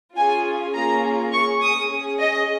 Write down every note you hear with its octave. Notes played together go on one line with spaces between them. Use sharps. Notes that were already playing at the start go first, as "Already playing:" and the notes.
C#4 F4 G#4 G#5
A#3 C#4 F4 G#4 A#5
C#4 G#4 C#6
D#6
C#4 G#4
D#5